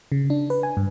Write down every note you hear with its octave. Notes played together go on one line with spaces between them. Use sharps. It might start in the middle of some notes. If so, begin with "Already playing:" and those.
C#3
D4
B4
G#5
G2